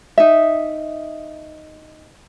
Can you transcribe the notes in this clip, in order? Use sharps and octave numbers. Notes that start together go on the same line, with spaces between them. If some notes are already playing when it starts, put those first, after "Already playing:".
D#4 E5